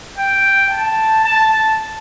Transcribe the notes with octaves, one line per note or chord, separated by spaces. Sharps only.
G5
A5
A5